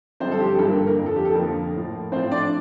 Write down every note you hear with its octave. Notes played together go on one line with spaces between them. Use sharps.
G2 D3 F3 C4 C5
A4
G4
G4
G2 D3 F3 A4
A#3 A#4
A#3 A#4
F2 D3 F3
A4
G4
A4
F2 D3 F3 A#3 A#4
A2 F3
A2 F3 C4 C5
D4 D5